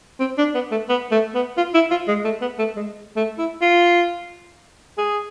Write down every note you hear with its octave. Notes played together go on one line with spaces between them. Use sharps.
C4
D4
B3
A3
B3
A3
B3
F4
E4
F4
G#3
A3
B3
A3
G#3
A3
E4
F4
G#4